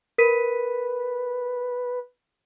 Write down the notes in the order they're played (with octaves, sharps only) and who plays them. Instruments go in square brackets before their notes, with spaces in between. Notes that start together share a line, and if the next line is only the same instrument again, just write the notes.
[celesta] A#4 B6 D#7 [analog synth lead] B4